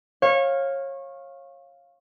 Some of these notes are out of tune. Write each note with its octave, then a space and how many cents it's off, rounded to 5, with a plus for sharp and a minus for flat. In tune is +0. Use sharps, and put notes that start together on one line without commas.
C#5 -25 F5 +5